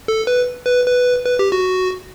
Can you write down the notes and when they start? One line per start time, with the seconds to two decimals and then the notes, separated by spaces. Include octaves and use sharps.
0.08 A4
0.27 B4
0.67 B4
0.86 B4
1.26 B4
1.39 G4
1.52 F#4